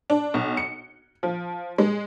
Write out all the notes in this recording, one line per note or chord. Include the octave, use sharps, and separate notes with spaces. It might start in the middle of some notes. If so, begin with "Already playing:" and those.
D4
B1
C#7
F3
G#3